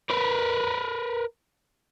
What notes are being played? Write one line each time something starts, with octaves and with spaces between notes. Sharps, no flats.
A#4 B4